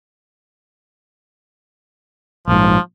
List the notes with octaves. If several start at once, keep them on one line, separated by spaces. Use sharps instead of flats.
A#1 G#2 F3